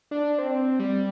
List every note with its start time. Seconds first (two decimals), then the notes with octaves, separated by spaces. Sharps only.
0.11 D4
0.39 C4
0.79 G3